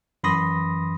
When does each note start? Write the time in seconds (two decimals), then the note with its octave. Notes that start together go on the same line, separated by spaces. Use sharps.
0.23 F#2 E3 B5 C6 D#6 A#6